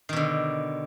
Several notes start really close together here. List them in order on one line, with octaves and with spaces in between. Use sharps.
D#3 B2 D3